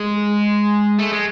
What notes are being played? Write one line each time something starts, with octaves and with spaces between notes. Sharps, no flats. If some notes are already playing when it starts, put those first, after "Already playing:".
Already playing: G#3
A3
G#3